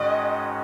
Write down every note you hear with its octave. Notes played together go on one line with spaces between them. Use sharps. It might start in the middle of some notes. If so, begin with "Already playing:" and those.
Already playing: G#2 D#3 G#3 C#4 F#4 D#5